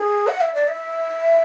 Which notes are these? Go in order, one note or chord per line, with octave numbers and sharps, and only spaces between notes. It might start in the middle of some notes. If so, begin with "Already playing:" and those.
Already playing: G#4
F#5
E5
D5
E5